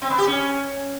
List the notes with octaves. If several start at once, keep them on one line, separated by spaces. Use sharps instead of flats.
C4
B3
G4
C#4